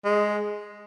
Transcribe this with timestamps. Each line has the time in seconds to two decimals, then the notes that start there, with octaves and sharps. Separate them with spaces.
0.05 G#3